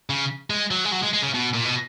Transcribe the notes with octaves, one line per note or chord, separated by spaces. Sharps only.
C#3
G#3
F#3
G#3
F#3
G#3
G#3
C#3
B2
A#2
B2